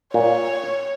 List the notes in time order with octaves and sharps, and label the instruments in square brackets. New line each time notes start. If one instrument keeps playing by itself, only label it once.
[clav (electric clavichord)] A#2 [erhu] C#5